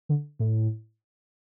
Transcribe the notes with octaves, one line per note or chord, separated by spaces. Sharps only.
D3
A2